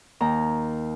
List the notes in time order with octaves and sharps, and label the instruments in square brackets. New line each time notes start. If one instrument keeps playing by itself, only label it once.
[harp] D#2 A#5